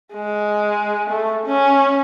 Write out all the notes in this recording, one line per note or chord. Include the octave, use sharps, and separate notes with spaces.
G#3
A3
C#4